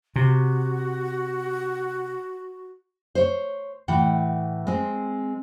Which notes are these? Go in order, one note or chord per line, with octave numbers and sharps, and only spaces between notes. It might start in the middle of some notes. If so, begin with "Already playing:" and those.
C3 F#4
C5 C#5
A2 E3 F#5 G5
G#3 C4